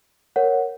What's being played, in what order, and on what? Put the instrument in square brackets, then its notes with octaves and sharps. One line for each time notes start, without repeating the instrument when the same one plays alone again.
[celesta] A#4 C#5 F#5